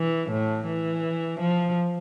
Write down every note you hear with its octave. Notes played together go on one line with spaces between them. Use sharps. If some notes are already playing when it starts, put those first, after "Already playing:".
Already playing: E3
A2
E3
F3